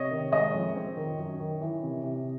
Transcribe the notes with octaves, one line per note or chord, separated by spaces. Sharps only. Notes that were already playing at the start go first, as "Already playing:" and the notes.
Already playing: C3 C#5 D#5
D#3
G#3 C#5 D#5
F2
C4
D#3
F#2
D#3
E3
C3
C3